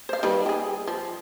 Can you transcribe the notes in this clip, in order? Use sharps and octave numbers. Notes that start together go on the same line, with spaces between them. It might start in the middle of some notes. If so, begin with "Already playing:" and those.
C5 F5
D#3 G3 B4
G4 G#4
F3